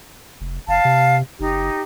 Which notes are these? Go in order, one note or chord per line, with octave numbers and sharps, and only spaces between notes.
F1
F#1 F5 A5
C3
F#1 D#4 G4